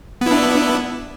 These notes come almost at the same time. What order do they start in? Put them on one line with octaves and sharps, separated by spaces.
B3 E4 D4